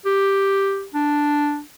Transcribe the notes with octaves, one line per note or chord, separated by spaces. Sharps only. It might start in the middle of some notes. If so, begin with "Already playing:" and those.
G4
D4